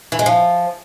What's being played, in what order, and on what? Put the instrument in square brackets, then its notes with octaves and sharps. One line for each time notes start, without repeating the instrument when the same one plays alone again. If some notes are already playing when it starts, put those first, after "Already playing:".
[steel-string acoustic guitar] E3
G#3
F3